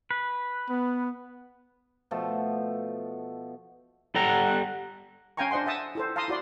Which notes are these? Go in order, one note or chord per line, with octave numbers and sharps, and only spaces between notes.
B4
B3
B2 F3 A3 A4
G3 A4 F#5 A#5
C#4 F5 G5 G#5 A#5 C#6
D4 C5 D#5 F#5 C6
E5 F#5 A5 D#6
E4 A4 C5
F5 A5 A#5 C6 D#6
E4 F#4 D5 C6